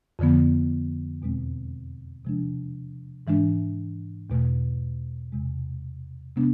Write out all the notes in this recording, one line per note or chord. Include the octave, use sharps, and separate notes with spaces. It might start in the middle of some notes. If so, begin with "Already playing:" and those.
F2 D3 F3 B3
E2 B2 G#3 C4
C3 F3 G#3 D4
G#2 E3 G#3 D4
E2 B2 A3
E2 C3 G#3
C3 G#3 B3 D4